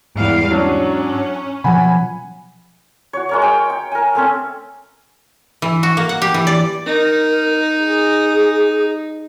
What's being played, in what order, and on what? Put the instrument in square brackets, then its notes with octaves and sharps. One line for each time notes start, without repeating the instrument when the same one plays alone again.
[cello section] E2 G3 F5 [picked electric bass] G#2
[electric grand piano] F#3 D4 [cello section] C#4
[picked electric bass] B2 F3 F#3 [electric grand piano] F#5 G#5 B5
[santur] F#4 C#5
G#3 A#4 C#5
G5
G5
A#4 G#5
A3 C4 C#4
[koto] E3
F#4
A#3
F#5
G4
E3
D5
[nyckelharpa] D#4 [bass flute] A#4
[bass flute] G#4